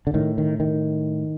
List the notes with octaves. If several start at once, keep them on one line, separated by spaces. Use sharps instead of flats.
D3
A2 D#3
D#3
D#3